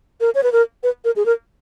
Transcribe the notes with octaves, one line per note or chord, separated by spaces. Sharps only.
A#4
C#5
B4
A#4
B4
A#4
G#4
A#4